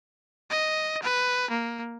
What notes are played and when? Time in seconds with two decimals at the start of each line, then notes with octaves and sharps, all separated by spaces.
0.50 D#5
1.02 B4
1.50 A#3